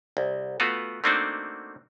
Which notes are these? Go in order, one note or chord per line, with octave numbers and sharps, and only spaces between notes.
C2
A3 B3 F4 F#4
A3 A#3 C4 D4 D#4 F#4